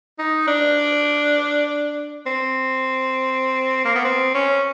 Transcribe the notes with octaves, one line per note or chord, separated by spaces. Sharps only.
D#4
D4
C4
A#3
B3
C4
C#4